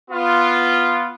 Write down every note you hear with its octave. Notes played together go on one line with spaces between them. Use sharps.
B3 F4